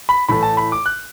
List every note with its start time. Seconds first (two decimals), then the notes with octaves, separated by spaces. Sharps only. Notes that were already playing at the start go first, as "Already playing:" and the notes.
0.09 B5
0.29 A2 E3 A3 B5
0.43 A5
0.57 B5
0.72 D6
0.86 F#6